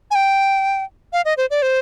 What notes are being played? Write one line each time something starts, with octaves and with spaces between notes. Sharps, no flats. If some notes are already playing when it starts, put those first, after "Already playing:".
G#5
G5
F5
D#5
C5
D5
C5